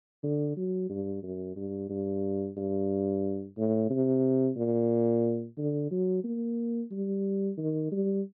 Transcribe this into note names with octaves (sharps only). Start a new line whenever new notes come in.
D3
F#3
G2
F#2
G2
G2
G2
A2
C3
A#2
D3
F#3
A#3
G3
D#3
G3